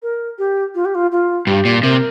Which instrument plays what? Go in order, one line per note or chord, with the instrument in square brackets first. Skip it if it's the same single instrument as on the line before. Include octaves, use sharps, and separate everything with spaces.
[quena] A#4
G4
F4
G4
F4
F4
[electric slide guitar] G2 [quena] G4
[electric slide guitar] A#2
[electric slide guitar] C3 [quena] A#4